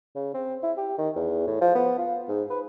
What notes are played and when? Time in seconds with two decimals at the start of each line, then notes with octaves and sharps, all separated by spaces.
0.15 C#3
0.34 C4
0.63 E4
0.77 G4
0.98 D#3
1.15 E2
1.47 A2
1.61 F3
1.75 B3
1.98 F4
2.28 G#2
2.50 B4